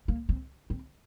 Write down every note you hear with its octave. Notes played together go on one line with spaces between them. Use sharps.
A#3
C4
C4